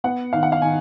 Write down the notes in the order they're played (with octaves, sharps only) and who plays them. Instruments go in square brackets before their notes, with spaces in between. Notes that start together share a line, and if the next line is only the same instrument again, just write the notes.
[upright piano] B3 F#5
D#3 F5
F#5
F5
D#3 G#5